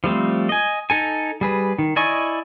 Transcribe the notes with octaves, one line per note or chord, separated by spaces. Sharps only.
F3 G3 A3 C4
D#5 G#5
D#4 A4 G#5
G3 G#4 B4
D#3
E4 D5 D#5 G#5 C#6